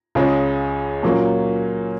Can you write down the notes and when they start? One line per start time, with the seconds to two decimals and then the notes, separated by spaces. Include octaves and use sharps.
0.15 C#2 C#3 G#3 C#4 G#4
1.03 A#2 F#3 A#3 C#4 F#4